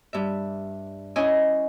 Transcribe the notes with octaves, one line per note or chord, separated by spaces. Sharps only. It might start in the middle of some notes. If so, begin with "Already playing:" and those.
G2 E5
C#4 E4 D#5 G#5 E6